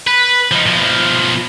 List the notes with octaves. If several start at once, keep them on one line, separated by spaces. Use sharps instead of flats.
B4
F3 D#4
B2 F3